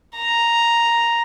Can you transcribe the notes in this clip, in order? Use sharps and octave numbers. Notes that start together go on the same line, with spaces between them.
A#5